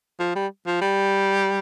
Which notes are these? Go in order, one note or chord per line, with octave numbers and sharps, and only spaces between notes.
F3
G3
F3
G3